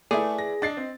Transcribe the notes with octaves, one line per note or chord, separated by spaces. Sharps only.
A3 E4 G#4 B4 D5
A#6
D4 D#5 A6 C7
C4